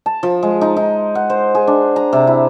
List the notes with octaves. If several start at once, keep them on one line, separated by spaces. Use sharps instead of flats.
A5
F3
G#3
D#4
D#4
F#5
C5
G#4
D4
A#5
C3
E4